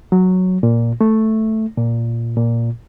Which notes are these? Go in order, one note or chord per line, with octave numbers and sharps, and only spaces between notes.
F#3
A#2
A3
A#2
A#2